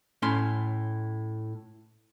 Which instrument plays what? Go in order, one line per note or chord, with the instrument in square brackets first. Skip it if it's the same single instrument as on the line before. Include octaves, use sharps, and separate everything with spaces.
[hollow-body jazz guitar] A2 C#4 C6